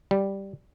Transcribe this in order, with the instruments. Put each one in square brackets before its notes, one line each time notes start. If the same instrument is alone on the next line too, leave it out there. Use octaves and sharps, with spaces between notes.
[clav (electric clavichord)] G3